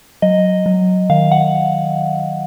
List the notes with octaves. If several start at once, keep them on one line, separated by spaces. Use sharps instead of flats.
F#3 D#5
F#3
D#3 F5
F#5